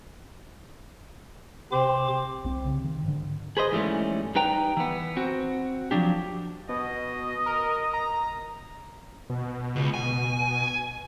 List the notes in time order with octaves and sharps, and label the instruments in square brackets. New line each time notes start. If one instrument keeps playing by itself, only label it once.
[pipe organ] C3 D6 [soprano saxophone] C4
[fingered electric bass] C2 C4
C#3
D#3
G#2 D3
[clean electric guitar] G#4 B4 C5 D#5
G#2 E3 G3 A3 C#4
G3 D#4 B4 G5 A#5
E3 B3
C4 F#4
F3 F#3 D4 G4
[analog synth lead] B2 [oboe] D#5
[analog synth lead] A#4
A#5
[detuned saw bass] B2
[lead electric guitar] C#2
G#5